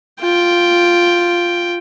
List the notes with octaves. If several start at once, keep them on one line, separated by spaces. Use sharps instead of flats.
F4 G5